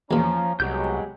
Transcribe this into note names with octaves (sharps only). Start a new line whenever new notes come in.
E2 A#2 F3 C#4 A#5
C2 B2 F#3 G#3 G4 G6